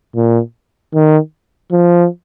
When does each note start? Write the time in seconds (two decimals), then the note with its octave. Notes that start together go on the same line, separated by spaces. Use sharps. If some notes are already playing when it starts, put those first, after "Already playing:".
0.16 A#2
0.94 D#3
1.72 F3